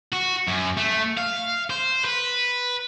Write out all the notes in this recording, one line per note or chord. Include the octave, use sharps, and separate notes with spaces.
F#4
F#2
A3
F5
C5
B4